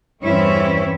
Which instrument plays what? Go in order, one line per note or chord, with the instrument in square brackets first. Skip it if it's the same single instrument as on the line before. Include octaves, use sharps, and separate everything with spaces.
[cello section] E2 G2 E3 C4 C#4 E4